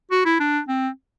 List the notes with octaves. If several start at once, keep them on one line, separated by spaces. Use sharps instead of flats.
F#4
E4
D4
C4